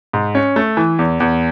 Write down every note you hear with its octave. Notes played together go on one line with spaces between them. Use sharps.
G#2
C#4
A3
E3
E2
E2